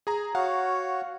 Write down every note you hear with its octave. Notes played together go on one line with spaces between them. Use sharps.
G#4 A#5
F#4 C#5 F5 F#5